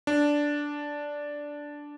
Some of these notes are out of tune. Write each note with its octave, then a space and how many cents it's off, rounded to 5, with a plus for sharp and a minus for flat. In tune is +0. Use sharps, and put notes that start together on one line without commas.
D4 -5